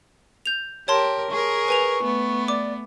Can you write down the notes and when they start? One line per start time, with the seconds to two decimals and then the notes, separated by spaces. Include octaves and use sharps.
0.46 G6 F7
0.88 G4 A#4 C#5 A5 C6
1.31 G#4 A#4 C#6
1.68 B4 G#5 F7
2.03 A3 B3
2.48 D5 D6